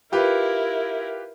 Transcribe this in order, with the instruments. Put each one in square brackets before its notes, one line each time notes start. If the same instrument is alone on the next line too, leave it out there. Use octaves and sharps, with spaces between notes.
[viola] E4 A#4 [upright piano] F4 G4 B4